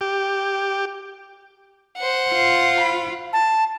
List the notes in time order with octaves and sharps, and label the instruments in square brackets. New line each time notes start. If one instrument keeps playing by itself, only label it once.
[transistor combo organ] G4
[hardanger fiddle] C5 F#5
[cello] F4
[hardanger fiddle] B5
[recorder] A5